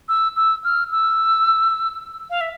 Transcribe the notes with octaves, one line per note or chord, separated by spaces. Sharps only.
E6
E6
F6
E6
F5
E5